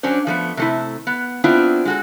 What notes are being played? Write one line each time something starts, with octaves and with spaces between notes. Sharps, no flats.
F#3 C#4 D4 C5
F3 A3 B3
C3 A3 E4
B3
B3 C4 D4 E4 F4
G#3 F#4 A4